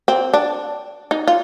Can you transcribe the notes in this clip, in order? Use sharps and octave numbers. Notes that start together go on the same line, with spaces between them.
C4
D4
D#4
F4